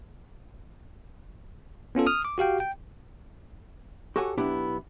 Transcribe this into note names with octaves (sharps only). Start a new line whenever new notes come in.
B3 C#4 F4 A4
D#6 F6
D6
F#4 G4 F5 G5
G5
F#4 G4 A4 C#5 F#5 G#5
B1 B3 D4 E4 G4